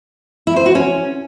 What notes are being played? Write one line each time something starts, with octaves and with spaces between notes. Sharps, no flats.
E4
C5
F#4
C#4